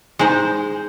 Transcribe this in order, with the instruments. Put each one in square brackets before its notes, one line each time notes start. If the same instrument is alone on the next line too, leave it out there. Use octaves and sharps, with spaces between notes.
[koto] G#3 D#4 C5